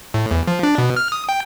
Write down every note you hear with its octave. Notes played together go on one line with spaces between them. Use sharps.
A2
E2
F3
D4
B2
F6
D#6
G5